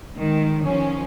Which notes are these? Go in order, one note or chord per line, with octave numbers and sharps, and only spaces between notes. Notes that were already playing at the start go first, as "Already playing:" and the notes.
D#3 G#3
D#3 F3 C#4